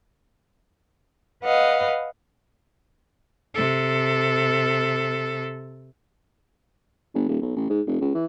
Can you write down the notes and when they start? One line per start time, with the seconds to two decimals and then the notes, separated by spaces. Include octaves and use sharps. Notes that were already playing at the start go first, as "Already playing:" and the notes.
1.45 B4 D#5 F5 F#5
3.55 C3 A4
7.14 G1
7.28 D#1
7.41 B1
7.56 A1
7.70 G#2
7.87 F1
8.01 C#2
8.15 E3